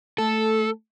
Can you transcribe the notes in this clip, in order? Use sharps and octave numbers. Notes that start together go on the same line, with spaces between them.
A3 A4